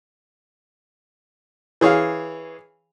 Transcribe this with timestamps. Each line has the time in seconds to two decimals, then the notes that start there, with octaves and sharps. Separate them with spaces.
1.81 E3 G#4 C#5 F5